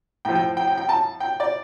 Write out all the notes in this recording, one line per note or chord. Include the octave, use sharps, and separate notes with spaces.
A2 F3 G5
G5
G5
G5
G5
A5
G5
D5